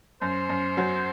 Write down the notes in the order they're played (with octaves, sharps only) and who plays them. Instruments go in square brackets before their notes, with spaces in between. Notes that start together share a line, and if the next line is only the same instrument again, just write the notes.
[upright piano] F#2 [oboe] C5
[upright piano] F#2
F#3